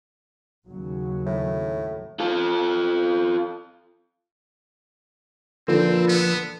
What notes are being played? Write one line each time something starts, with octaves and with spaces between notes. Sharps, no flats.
D#2 C#3 F#3
A2
F4 A4
A#2 D3 F3 C4 B4 E6
B3